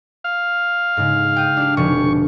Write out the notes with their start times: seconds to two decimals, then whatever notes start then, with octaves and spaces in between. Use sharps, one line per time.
0.24 F5
0.97 G#2 C#3
1.36 G5 D#6
1.57 D4 G4
1.77 F1 B2 D3 C#6